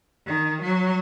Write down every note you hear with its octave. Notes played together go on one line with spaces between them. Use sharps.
D#3
F#3